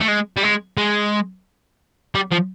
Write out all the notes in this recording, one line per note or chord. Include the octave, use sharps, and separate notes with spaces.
A3
G#3
G3
G#3
G#3
G3
F3